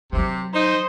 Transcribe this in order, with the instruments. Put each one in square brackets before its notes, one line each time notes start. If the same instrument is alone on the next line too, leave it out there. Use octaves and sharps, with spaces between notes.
[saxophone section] C3 [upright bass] D#3 F#3
[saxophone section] D#4 [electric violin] C5